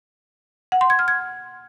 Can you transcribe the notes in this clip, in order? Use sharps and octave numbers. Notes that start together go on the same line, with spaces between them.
F#5
C6
G#6
F6
G#6